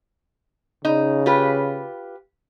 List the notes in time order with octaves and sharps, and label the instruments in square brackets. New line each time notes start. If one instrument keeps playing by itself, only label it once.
[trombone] C#3 [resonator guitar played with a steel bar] D#4
[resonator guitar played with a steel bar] F4 G4 B4